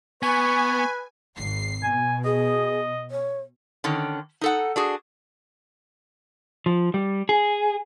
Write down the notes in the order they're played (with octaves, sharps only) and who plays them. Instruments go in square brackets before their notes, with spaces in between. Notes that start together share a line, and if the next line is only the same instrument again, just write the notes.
[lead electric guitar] B3 [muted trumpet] B4 [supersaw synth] G#5 [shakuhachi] C#6
[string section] G#1 C7
[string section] B2 [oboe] G#5
[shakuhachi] G#4 [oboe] D#5
[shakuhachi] C#5
[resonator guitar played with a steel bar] D3 D#3 C#4
D#4 A4 F#5
D4 F#4 G#4
[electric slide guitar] F3
G3
G#4